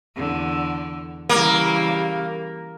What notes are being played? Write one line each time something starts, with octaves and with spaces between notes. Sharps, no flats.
E2 D3
C#3 E3 G3 A#3